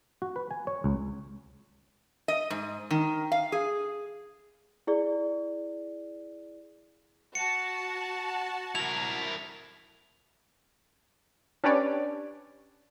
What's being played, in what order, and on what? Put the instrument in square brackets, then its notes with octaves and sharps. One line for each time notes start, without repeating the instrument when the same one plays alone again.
[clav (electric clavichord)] F#4
B4
G#5
C#5
C#2
[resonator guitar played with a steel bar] D#5
G#2
D#3
F5
G#4
[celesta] E4 G#4 D5
[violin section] F#4 A5 [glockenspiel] C#7
[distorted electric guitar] E4 A#4 [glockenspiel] F7
[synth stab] C#4 D4 G4 B4 C#5 D5